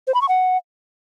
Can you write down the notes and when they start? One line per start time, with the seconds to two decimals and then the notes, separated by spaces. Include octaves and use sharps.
0.07 C5
0.14 B5
0.22 C#6
0.29 F#5